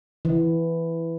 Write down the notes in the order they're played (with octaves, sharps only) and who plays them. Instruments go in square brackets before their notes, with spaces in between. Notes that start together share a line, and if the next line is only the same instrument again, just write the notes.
[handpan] E3